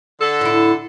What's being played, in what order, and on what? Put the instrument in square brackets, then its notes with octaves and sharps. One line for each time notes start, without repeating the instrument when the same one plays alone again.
[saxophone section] D3 A4
[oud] A2 E4